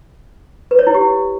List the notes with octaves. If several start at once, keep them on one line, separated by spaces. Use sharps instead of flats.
B4
C#5
E4
G4